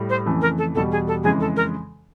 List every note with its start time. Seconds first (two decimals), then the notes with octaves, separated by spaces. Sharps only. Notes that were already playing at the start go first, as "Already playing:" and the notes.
Already playing: A2 G3
0.10 C5
0.26 F2 C#3 E3 A3
0.42 A#4
0.58 A4
0.75 E2 B2 G3 A4
0.92 G#4
1.08 A4
1.24 F2 C#3 E3 G#3 G#4
1.40 A4
1.56 A#4